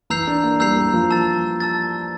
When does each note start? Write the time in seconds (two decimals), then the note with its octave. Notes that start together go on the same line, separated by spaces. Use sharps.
0.10 E3 A#5 E6 G6 C7 F7
0.27 D4
0.43 A#3
0.60 G3 A#5 E6 G6 C7 F7
0.76 G3
0.94 F3
1.11 A5 E6 A6
1.60 A5 E6 A6